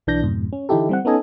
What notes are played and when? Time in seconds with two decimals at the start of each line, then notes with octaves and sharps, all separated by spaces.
0.07 B1 E3 D4 G6 A#6
0.22 F2 G#2 B2
0.53 C#4
0.69 D3 E3 D#4 E4 G4 A4
0.89 G3 C4 F#5
1.05 B3 C#4 D#4 A4 D#5 G#5